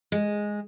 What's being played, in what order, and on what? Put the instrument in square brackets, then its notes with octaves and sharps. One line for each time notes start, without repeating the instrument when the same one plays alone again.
[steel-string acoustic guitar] G#3